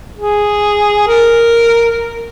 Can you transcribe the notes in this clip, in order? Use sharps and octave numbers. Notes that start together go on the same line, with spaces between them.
G#4
A#4